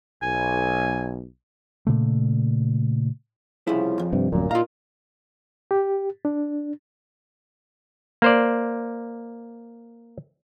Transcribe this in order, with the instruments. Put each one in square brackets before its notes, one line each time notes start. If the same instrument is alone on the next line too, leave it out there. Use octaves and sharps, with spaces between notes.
[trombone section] B1 [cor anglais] G#5
[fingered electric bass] A#2 C#3 A3
[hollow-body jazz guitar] C2 E4 [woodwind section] C#3 F3
[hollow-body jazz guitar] F2
[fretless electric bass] G2 C3
[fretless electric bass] D1 F#2 [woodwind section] A#2
[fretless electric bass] A#2 [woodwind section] D#4 A#4 F5 [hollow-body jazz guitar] F4 A#5
[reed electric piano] G4
D4
[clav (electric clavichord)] A#3 C5 D5